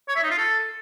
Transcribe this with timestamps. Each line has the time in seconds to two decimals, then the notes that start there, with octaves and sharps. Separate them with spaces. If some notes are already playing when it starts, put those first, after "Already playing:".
0.08 C#5
0.16 E5
0.23 D#4
0.30 F4
0.38 A4